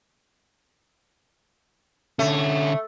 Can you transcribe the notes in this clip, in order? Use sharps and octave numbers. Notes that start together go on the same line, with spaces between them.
D3 A3 C#4